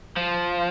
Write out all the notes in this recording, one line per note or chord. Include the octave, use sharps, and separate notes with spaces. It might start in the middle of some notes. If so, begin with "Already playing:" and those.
F3